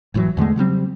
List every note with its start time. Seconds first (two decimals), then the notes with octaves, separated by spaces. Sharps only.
0.14 F1 A2 E3 F#3
0.37 E2 D3 G#3 A3
0.56 C#3 F#3 G3 C4